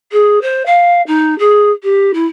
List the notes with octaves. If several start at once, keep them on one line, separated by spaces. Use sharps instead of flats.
G#4
C5
F5
D#4
G#4
G4
E4